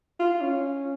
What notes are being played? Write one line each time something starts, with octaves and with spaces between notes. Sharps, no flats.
F4
C#4